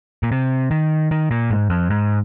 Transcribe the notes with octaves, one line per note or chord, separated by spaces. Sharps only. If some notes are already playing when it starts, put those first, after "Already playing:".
A#2
C3
D#3
D#3
A#2
G#2
F2
G#2